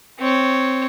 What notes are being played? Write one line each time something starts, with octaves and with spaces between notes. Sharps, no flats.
C4 C#5